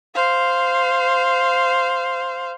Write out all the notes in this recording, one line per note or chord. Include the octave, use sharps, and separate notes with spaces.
C5 F5